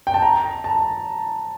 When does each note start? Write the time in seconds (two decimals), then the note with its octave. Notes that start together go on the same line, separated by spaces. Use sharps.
0.07 G5
0.14 A5
0.22 A#5
0.64 A5